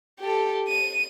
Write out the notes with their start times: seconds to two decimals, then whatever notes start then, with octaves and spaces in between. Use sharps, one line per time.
0.20 G4 A4
0.68 D#7